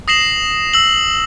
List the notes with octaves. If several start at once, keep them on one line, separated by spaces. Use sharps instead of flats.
D#6 A#6 C7 E7 F#7
E6 F#7